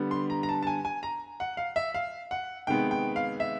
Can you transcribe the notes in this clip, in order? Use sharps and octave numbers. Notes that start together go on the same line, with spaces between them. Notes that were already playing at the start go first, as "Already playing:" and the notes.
Already playing: D3 G3 B3
C6
A#5
A#5
A5
A5
G#5
G#5
A#5
F#5
F5
E5
F5
F#5
C3 D#3 G#3 B3 G5
G5
F5
E5